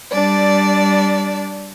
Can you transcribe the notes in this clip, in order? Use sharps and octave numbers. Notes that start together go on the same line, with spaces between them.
G3 D4 D5